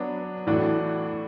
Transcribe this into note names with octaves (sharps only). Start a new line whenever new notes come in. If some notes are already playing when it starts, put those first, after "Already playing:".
Already playing: F#3 B3 D4
A2 E3 A3 D4 F#4